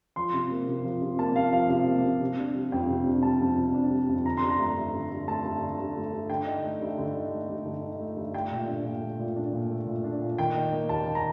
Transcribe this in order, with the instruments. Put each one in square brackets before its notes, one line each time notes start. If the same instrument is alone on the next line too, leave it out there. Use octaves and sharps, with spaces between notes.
[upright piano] F3 C6
C3
A#3
C3
F3
C3
A#3 A5
C3 F5
F3 F5
C3 F5
A#3
C3
C3
D4
G3
F2 G5
C3
D4
G3 A5
F2
C3
D4
G3
F2
D3 A#5
G2 C6
A#5
A3
G2
D3
G2
A3 A5
G2
D3
G2
A3
G2
D3 G5
D#4
A3
G2
D3
D#4
A3
G2
D3
D#4
A3
G2
A3 G5
A#2
D4
A#2
A3
A#2
D4
A#2
A3
A#2
D4
A#2
D#3 G5
D#4
A#3
D#2 A5
D#3
A#5